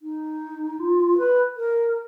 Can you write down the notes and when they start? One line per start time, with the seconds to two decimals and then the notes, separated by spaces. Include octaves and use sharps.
0.02 D#4
0.80 F4
1.18 B4
1.57 A#4